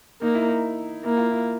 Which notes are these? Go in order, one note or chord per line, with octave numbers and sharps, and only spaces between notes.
A#3 D#4
E4
D#4
A#3 E4
F4
E4